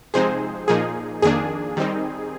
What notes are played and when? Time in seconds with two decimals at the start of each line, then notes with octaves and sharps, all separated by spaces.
0.14 C3 F3 G#3 C4 D#4 G#4 C5
0.68 A#2 F3 A#3 D#4 G#4
1.22 F2 D#3 A#3 D4 G#4
1.77 D#3 G3 C4 D#4